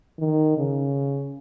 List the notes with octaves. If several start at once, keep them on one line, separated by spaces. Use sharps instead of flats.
D#3
C#3